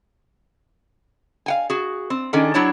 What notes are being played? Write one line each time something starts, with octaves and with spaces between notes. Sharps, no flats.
F5 F#5 G#5
F#4 G#4
C4
D#3 C#4 D4 G#4 A4
F#3 D4 E4 C#5 A5